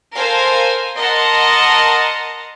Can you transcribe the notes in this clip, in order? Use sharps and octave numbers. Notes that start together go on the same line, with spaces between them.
A4 A#4 C5 F5 G#5
A#4 D#5 F#5 A5 A#5 C6